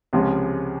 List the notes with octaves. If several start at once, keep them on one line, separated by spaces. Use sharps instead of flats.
C#2 C3 F3 G#3 C#4